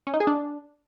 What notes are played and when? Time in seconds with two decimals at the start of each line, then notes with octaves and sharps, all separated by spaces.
0.07 C#4
0.14 D#4
0.20 G#4
0.27 D4